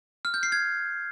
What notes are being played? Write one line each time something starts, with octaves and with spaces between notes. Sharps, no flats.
F6
G6
C7
G#6